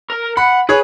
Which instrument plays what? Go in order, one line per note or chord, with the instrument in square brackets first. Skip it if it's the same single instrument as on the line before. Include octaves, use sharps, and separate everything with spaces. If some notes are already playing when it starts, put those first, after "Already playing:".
[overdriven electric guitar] A#4
[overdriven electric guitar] F#5 [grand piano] B5
[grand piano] G#4 C#5 [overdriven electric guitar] B4